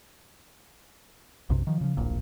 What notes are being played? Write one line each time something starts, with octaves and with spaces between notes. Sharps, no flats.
B1 F#2 C3
D#3 F3
C#3 F3
D1 A#1 A#2